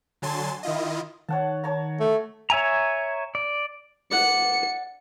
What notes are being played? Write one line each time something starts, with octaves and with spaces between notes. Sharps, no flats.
D3 F#3 G#5 A5 C6 A6
D#3 E4 F4 D#5
D#3 C#5 F#5 A5
C#5 A5 A#5
A3
C#5 E5 G#5 A#5
D5
D5 F#5 C#7